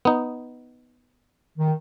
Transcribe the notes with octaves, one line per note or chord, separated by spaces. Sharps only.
B3 D#4
D#3